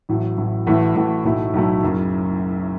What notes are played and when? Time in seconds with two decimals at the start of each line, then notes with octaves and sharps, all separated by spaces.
0.09 A1 A2 F#3
0.37 A1 A2 F#3
0.66 A1 A2 E3 A3 F#4
0.96 A1 A2 E3 A3 F#4
1.24 B1 A2 F#3 A3 E4
1.54 B1 A2 F#3 A3 E4
1.83 F#1 F#2 C#3